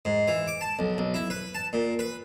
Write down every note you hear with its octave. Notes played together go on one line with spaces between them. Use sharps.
G#2
E3
D6
A5
B1
B1
E4
B4
A5
A#2
B4